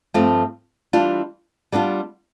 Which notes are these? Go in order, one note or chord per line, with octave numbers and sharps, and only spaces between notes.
G2 F3 A3 C4 F4
E3 G3 D4 F4
G3 B3 D4 F4